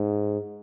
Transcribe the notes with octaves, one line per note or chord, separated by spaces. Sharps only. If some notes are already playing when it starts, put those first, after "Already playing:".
Already playing: G#2